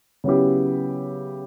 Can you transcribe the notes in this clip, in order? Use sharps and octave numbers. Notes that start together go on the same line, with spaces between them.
C#3 F#3 B3 E4 G4